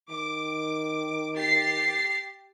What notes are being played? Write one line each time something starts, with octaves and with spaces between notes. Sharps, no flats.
D#3 D6
G4 A6 C7